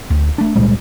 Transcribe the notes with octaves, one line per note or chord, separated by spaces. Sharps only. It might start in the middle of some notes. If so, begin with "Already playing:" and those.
D2
A3 D4
C#2 A#2 G3 G#3